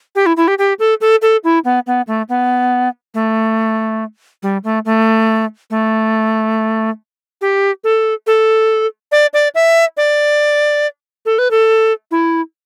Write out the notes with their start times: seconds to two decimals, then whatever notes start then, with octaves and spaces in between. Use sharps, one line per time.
0.15 G4
0.26 E4
0.37 E4
0.48 G4
0.58 G4
0.79 A4
1.01 A4
1.22 A4
1.44 E4
1.64 B3
1.87 B3
2.07 A3
2.29 B3
3.14 A3
4.43 G3
4.64 A3
4.85 A3
5.70 A3
7.41 G4
7.84 A4
8.27 A4
9.12 D5
9.33 D5
9.55 E5
9.97 D5
11.26 A4
11.38 B4
11.51 A4
12.11 E4